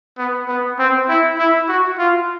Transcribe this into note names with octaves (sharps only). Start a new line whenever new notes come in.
B3
B3
C4
E4
E4
F#4
F4